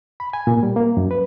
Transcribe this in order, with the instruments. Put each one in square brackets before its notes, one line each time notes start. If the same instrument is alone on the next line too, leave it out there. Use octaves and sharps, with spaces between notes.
[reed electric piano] B5
G#5
A#2
G3
A#3
F#2
B4